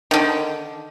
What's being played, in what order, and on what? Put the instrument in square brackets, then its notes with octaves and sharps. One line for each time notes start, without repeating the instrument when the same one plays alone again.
[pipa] D3 D#3